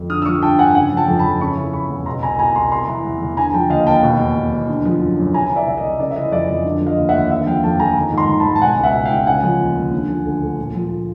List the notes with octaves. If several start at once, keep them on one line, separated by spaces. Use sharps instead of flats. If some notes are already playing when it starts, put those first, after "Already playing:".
Already playing: F2
D3 D#6 F6
E6
F3 C#6 D#6
G2 G5 A5
G2 F#5 G#5
C#3 F#5 G#5
F3
G5 A5
F2
A5 B5
F2
C#3 B5 C#6
E3
E2 B5 C#6
E2
B2 A#5 C6
C2 G#5 A#5
B2 G#5 A#5
C2 A#5 C6
C3 A#5 C6
E3
E2
E2
D3 G#5 A#5
F3 G5 A5
D#2 D#5 F5
D#2 G5 A5
B2
E2
B2
E2
D3
F3
F#2
F#2
C3 G#5 A#5
E3
D5 E5
C2 E5
D#5
C2
C#3 D5
E5
E3 D#5
F2 D5 E5
F2 D#5
D3
F3
D#5 F5
D#2
E5 F#5
D#2
D3 E5 F#5
F3 F5 G5
F2 G5 A5
F2 G#5 A#5
D#3
G#2
A#5 C6
D#3
A5 B5
G#2
A5
B2 F#5 G#5
C#2
E5 F#5
B2
F5 G5
C#2
C#3 F#5 G#5
F3
D#2
D#2
D3
F3
D2
D2
A#2
F3